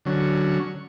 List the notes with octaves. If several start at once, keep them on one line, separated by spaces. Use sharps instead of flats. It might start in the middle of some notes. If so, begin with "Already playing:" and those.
D3 F#3 C#4